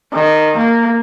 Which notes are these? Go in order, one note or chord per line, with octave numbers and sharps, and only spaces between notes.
D#3
A#3